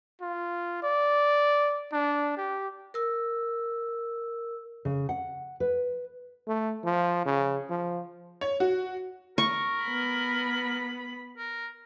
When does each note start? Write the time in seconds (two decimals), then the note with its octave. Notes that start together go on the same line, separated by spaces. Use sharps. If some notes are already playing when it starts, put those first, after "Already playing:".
0.22 F4
0.83 D5
1.93 D4
2.37 G4
2.94 A#4 E6
4.85 C#3
5.09 F#5
5.60 B4
6.48 A3
6.84 F3
7.26 C#3
7.70 F3
8.41 C#5
8.60 F#4
9.38 A#4 C#6
9.83 B3 B5
11.37 A#4